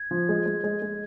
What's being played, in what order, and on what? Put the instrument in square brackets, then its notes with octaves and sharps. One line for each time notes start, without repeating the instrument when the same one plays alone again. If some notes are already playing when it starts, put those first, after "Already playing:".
Already playing: [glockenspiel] G#6
[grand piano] F3
G#3
G#3
G#3
G#3